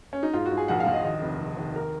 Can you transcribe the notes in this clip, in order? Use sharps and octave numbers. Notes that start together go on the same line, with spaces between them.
C#4
D#4
G#2 F4
F#4
G#2
G#4
A#1 F#5
F5
A#1
D#5
D#2 D#5
F1
F1
D#2
A#4